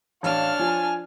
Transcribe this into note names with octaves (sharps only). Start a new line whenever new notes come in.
A1 D4 C#5 F5 A5 F6
F3 F4 G#5